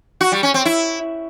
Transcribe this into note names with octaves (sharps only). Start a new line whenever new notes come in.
F#4
G3
C#4
C4
E4